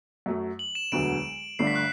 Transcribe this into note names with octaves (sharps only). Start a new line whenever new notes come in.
F#2 F#3 A3
F#7
E7
E1 D2 D3 F#3 B3 D7
G1 G2 D3 A3 D4 C7
B6
F#6